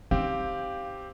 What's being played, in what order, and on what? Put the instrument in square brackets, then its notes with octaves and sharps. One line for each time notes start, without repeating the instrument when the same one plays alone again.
[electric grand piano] C4 G4 [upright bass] D#4 [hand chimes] F5